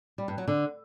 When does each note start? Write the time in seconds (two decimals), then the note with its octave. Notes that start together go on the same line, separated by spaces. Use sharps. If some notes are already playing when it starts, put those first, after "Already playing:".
0.18 G3
0.28 G2
0.38 F#3
0.48 D3